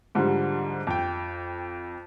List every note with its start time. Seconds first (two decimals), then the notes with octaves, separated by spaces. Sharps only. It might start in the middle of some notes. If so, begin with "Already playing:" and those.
0.15 G#2 D3 F3 G3
0.87 F2 G5